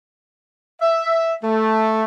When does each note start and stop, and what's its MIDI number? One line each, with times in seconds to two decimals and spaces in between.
0.82 1.37 76
1.44 2.04 57